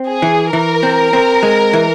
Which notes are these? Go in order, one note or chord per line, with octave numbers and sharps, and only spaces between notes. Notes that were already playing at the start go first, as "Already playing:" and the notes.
Already playing: C4
G#4
E3
E3 A#4
C4
C4
G#3
E3